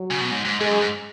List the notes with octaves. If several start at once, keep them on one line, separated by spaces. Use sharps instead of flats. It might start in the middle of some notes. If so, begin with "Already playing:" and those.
Already playing: F#3
C#3
B2
G#2
G#2
G#2 G#3
F#2
G#2